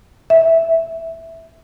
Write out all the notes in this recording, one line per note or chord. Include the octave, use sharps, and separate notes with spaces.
E5